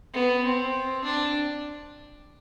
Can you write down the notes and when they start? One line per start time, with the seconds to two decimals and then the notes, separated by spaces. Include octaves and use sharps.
0.14 B3
0.44 C4
1.04 D4